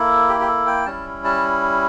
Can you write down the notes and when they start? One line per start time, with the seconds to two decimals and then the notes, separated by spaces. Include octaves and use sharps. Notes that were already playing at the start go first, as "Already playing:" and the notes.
Already playing: A#3 E4 A4
0.29 G4
0.40 G4
0.47 A4
0.67 G5
0.86 G3 C#4 E4 A5
1.24 A5